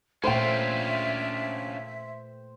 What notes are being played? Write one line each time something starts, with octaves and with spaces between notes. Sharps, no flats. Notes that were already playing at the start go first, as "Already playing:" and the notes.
A#2 A3 C#4 D4 F4 C5 E5 G5